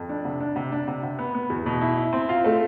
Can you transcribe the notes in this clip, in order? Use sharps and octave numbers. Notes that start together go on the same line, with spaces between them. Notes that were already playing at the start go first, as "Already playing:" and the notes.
Already playing: F2
D4
C3
D4
C3
D4
C3
C3
B3
B3
E2
B2
E4
E4
C4
F4
A3